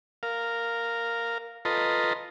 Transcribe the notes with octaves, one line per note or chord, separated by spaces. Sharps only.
A#4 F5
F4 A4 B4 D#5 A#5 C6